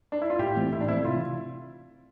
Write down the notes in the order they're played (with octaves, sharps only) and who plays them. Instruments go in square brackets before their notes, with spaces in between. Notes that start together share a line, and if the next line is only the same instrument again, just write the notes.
[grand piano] D4
E4
F4
[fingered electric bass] A2 [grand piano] G4
[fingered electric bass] E3 A3 C4
[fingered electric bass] A2 [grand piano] E4
[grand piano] D4
[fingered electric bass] E3 A3 C4 [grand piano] E4
[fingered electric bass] C3 [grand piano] F4